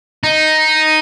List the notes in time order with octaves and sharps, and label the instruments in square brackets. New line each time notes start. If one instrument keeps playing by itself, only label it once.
[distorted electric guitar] D#4